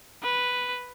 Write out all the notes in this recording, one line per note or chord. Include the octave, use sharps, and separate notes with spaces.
B4